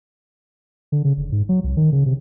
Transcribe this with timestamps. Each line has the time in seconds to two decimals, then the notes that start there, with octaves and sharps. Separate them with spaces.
0.92 D3
1.04 C#3
1.17 F1
1.32 G#2
1.49 F#3
1.64 C2
1.77 D#3
1.92 C#3
2.06 C3